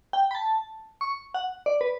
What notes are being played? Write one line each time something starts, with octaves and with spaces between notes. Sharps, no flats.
G5
B5
A5
C#6
F#5
D5
B4